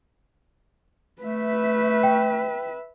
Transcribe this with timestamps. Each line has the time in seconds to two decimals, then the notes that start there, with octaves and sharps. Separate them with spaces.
1.22 A3 B4 E5
2.03 G5